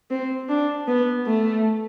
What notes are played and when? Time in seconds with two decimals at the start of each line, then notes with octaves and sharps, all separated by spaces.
0.11 C4
0.49 D4
0.88 B3
1.27 A3